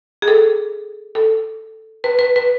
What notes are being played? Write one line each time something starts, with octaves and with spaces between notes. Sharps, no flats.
G#4
A4
A4
B4
B4
B4